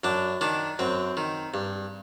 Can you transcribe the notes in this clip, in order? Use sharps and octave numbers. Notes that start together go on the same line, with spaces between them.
F#2 D4
D#3 D4
F#2 C4
D#3
G2